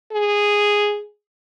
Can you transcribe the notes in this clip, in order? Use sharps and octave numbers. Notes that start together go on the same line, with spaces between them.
G#4